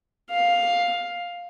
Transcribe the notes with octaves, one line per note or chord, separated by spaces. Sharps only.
F5